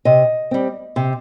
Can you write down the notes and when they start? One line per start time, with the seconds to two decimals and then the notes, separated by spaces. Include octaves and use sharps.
0.05 C3 D#5
0.51 G3 C4
0.96 C3